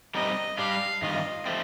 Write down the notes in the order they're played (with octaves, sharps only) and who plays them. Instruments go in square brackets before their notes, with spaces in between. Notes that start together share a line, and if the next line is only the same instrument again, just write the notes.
[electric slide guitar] G3 C4 D#4 A#4 [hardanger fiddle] D#5
[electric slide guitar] G3 D4 G4 [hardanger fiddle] F5
[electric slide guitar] G2 D#3 F4 [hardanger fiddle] D#5
[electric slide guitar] F3 A3 C4